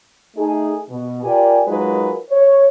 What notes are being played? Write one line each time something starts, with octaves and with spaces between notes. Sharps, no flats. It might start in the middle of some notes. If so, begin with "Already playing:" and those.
A3 D#4 G#4
B2
F4 G4 A#4 D5 G5 G#5
F#3 G#3 D#4 F4 A#4 B4
C#5